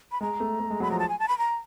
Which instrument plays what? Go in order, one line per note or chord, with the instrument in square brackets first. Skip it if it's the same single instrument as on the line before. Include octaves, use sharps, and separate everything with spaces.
[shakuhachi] B5
[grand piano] G#3 [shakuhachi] A#5
[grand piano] A3
A3
G#3
[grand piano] F#3 [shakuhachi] B5
[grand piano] F3 [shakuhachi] A#5
[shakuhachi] A5
G#5
A5
B5
A#5